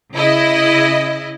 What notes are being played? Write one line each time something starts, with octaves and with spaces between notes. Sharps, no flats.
C#3 E4 D#5